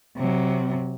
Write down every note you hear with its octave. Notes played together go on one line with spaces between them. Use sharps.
C3 F#3